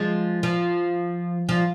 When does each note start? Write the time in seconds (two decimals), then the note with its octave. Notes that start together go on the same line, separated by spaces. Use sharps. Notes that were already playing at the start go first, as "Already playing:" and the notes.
Already playing: F3 G#3
0.43 F3
1.49 F3